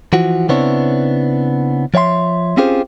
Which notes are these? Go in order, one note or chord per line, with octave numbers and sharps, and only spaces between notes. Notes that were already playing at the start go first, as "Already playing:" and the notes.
E3 F3 F#4
C#3 B3 C4 D4 E4 C#5
F3 C#5 E5 F#5 C6
C4 C#4 F4 G4 G#4 C5